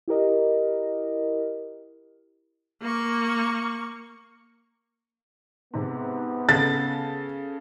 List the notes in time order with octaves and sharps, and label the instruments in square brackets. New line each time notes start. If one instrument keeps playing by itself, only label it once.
[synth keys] E4 G4 A#4 D#5
[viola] A#3 C#6
[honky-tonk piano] G#2 C3 [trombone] B3
[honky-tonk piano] C#3 A4 [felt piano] A6